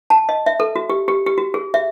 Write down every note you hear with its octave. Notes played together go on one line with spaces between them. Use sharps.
A5
D#5
E5
A4
F#4
G4
G4
G4
F#4
G#4
E5